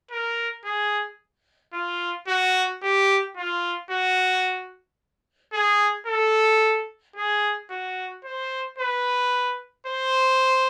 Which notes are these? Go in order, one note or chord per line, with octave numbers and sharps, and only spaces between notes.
A#4
G#4
F4
F#4
G4
F4
F#4
G#4
A4
G#4
F#4
C5
B4
C5